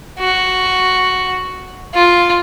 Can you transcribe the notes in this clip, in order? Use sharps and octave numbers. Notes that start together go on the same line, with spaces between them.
F#4
F4